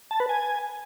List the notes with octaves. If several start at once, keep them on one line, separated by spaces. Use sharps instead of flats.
A5
B4
G#5